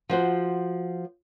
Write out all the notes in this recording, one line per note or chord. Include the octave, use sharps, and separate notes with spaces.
F3 F#4 C5